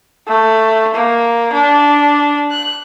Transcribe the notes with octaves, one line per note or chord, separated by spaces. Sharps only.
A3
A#3
D4
F#6